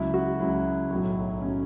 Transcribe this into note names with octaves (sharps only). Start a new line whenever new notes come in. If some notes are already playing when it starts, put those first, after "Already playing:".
Already playing: C#2 C#3 F#3 E4
F#4
C#2 C#3 F#3 E4
B1 A2 F#3
A2 F#3 C#4